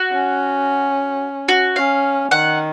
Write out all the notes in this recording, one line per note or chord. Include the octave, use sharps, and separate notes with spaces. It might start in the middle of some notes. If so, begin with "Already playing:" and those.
Already playing: F#4
C#4
F#4
C#4 F5
D#3 F#5